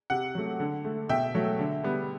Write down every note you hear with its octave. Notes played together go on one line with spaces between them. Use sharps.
C3 F#5
F#3 A3
D3
A3
B2 E5 G5
F#3 A3
D3
G3 B3